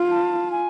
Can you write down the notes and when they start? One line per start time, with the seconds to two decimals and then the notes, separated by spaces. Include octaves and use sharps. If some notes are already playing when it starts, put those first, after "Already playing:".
Already playing: F4
0.11 A5
0.51 G#5